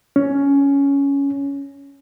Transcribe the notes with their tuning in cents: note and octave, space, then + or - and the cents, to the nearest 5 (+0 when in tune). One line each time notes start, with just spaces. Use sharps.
C#4 +10